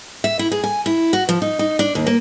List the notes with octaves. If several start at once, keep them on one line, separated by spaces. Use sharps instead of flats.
E5
E4
G#4
G#5
E4
F#4
F3
D#4
D#4
D4
D#2
A#3